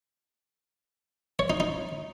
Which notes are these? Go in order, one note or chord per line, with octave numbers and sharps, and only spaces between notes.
C#5
D#4
D#4